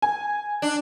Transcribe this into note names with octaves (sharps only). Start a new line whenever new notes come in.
G#5
D4